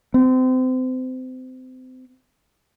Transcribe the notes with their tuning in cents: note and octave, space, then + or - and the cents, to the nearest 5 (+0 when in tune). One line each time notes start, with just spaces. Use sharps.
C4 -30